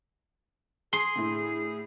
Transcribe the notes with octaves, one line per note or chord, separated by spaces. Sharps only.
G#4 C6
A2 D3